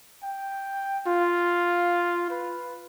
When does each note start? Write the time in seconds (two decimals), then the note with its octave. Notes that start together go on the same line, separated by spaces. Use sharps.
0.23 G5
1.07 F4
2.31 B4